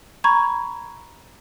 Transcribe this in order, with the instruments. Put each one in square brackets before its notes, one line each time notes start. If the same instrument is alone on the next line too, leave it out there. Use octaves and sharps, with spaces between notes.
[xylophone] A#5 B5 C#6 G#6